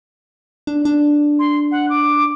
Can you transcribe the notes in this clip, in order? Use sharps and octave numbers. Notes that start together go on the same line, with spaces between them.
D4
D4
C6
F#5
D6